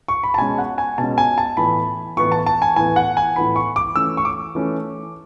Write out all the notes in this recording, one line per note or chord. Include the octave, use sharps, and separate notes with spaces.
C#6
B5
A5
B2 G#3 C#4 G#5
F#5
G#5
B2 G#3 C#4 A5
G#5
A5
A2 E3 B3 B5
A2 E3 B3 C#6
A5
A5
G#5
A2 E3 B3 G#5
F#5
G#5
A2 E3 B3 B5
C#6
D6
E3 A3 C#4 E6
C#6
D6
E3 A3 C#4